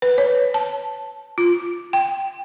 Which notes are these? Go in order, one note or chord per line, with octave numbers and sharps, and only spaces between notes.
B4
C#5
A5
F4
G5